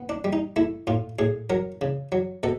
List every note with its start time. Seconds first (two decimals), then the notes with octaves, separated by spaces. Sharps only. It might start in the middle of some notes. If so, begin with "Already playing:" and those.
Already playing: B3
0.09 D4
0.24 G3
0.33 D#4
0.56 A3 E4
0.87 A2 F4
1.19 A2 G#4
1.50 F#3 A#4
1.81 C#3
2.12 F#3
2.43 B2 A4